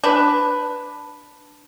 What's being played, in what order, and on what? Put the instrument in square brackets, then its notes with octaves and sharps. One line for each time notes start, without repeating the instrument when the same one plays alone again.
[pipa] D4 B4